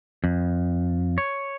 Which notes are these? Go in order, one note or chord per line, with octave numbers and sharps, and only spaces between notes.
F2
C#5